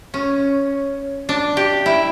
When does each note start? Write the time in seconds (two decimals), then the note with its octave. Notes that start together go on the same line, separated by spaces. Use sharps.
0.14 C#4
1.29 D4
1.57 G4
1.86 E4